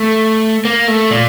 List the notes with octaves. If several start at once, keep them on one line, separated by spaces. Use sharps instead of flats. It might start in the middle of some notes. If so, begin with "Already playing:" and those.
Already playing: A3
A#3
A3
A#2